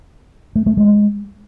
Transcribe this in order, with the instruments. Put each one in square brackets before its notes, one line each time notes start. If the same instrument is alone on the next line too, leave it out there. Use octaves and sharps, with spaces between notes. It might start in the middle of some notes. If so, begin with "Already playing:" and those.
[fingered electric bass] A3
A3
G#3